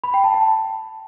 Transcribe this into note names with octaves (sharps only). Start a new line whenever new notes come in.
B5
G5
A5
A5